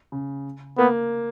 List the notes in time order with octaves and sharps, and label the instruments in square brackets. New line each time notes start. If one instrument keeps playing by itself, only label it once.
[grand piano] C#3
[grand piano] A#3 [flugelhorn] B3